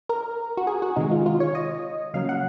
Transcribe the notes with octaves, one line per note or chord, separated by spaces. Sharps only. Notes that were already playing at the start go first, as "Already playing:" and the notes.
A#4
F#4
G#4
F#4
C3 D#3 G#3 D#4
F4
F4
C#5
D#5
C#3 F#3 A#3 F5
F#5